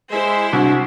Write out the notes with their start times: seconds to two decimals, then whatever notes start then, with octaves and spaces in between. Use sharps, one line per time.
0.11 G#3 E4 C5 E5
0.53 C2 D4 F#4